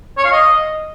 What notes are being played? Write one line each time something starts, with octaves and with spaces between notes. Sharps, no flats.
C#5
F5
D#5